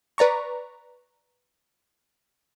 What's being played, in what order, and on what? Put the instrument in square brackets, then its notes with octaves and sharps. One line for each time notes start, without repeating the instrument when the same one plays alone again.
[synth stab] B4 D5 A#5 C#6